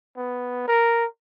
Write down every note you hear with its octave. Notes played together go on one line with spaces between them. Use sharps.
B3
A#4